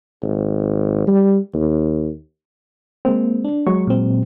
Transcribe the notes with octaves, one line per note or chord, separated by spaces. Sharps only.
G#1
G3
D#2
G#3 A#3 C4
D4
F#3 G#3 C#6
A#2 C4